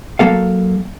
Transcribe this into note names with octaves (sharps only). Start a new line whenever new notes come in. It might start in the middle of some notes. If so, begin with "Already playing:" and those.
F#3 A#3 A4 F5